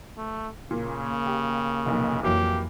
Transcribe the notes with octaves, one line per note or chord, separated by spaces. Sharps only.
A3
A#2 C#3 A#3
G4
F1 B1 A#2
F2 E3 F#3 A#3 G4